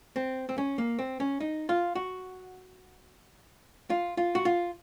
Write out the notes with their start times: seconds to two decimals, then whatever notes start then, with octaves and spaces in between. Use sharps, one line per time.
0.16 C4
0.49 C4
0.58 C#4
0.78 A#3
0.99 C4
1.20 C#4
1.40 D#4
1.69 F4
1.95 F#4
3.90 F4
4.17 F4
4.35 F#4
4.45 F4